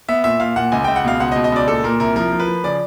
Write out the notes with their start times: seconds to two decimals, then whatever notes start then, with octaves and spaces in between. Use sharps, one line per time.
0.09 B3 E5
0.24 A#2 E5
0.40 A#2 F5
0.56 A#2 F#5
0.72 C#2 G#5
0.84 C#2 G5
0.96 F#5
1.04 B2 F5
1.20 C#2 F#5
1.32 D#5
1.36 B2
1.44 D#5
1.52 C#2 D5
1.68 A#2 A4
1.84 A#2 A#4
2.00 C2 A#4
2.16 F3 A#4
2.32 F3
2.40 B4
2.48 F3
2.64 C#3 D5